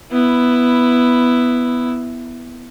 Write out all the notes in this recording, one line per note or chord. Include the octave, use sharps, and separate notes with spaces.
B3 E4